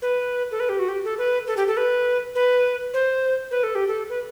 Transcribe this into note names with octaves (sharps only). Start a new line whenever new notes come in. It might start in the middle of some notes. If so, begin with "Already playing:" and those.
B4
A4
B4
G4
F#4
G4
A4
B4
A4
G4
A4
B4
B4
C5
B4
A4
G4
A4
B4